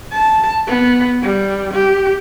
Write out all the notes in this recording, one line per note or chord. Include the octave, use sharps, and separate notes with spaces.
A5
B3
G3
G4